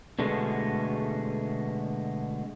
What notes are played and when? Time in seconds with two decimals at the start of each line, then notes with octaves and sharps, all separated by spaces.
0.19 B2 D3 G#3 A3 B3